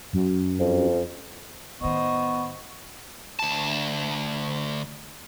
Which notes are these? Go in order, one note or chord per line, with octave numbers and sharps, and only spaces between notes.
F#2
F2
A2 D#3 B3 C5 D#5 C#6
D2 A5